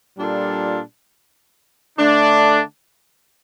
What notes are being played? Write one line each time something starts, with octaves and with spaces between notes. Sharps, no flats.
A#2 G3 D4 F4 A4
D3 A3 D4